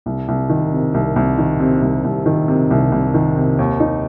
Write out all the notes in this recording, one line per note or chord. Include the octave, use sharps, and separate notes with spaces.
C2
C2
D#3
C3
C2
C2
D#3
C3
C2
C2
D#3
C3
C2
C2
D#3
C3
D#2
D#4